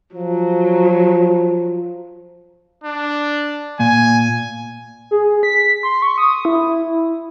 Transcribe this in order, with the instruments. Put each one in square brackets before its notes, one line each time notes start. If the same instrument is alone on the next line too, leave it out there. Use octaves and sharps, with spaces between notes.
[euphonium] F3 [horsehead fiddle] F#3
[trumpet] D4
[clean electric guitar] A#2 [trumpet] G#5
[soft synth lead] G#4
B6
C6
C#6
D#6
E4